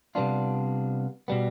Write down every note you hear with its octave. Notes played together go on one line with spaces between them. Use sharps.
C3 G3 B3 D4 F4
B2 G3 B3